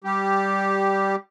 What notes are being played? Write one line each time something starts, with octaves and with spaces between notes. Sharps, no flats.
G3 G4